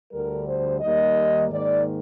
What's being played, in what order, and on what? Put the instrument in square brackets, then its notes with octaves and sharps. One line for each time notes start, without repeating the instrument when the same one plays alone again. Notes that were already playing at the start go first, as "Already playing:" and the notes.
[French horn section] D2 D3 G3 A#4
C5
D#2 D#3 G3 A#3 D#5
G#2 D#3 A#3 D5